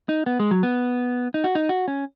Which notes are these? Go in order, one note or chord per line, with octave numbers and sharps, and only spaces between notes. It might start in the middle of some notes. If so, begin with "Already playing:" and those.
D#4
B3
G#3
F#3
B3
D#4
F#4
D#4
F#4
C#4